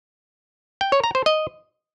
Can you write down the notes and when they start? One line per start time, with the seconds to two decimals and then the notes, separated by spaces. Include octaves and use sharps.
0.81 G5
0.92 C#5
1.04 A#5
1.15 C5
1.26 D#5